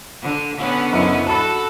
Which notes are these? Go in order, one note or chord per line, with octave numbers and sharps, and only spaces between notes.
D3
D3 B3 C#4
F#1 E4 C#7
F#4 A4 A5 B5